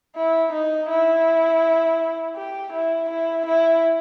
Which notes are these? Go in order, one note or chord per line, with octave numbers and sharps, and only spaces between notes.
E4
D#4
E4
G4
E4
E4
E4